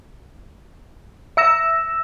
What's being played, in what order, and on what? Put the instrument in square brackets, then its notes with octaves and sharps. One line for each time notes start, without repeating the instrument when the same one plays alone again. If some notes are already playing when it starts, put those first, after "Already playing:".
[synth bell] E5 E6 A#6 E7